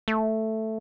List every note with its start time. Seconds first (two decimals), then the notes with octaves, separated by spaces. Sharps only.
0.08 A3